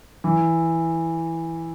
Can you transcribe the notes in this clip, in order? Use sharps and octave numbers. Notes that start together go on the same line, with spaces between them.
E3